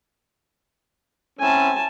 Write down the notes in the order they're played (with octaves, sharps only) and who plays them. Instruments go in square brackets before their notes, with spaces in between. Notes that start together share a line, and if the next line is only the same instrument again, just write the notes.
[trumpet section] C4 C#4 E4 [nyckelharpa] G#5 A5